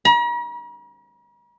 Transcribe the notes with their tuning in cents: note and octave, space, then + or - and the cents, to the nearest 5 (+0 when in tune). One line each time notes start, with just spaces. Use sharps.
A#5 +45